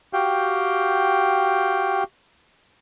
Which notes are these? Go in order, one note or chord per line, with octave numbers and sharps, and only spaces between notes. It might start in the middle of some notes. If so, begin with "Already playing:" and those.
F#4 G4 F5 G5